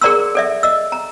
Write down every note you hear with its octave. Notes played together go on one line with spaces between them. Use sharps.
G#4 A#4 D5 A#5 C6 E6
A4 D5 E5
D#5 E6
A#5